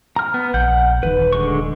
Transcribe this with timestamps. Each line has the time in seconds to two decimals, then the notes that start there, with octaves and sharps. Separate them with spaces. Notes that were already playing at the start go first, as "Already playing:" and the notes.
0.16 A#5 F6
0.34 B3
0.54 A#1 F#5 G6
1.03 D#1 D#2 D#3 B4
1.33 D3 G#3 C#6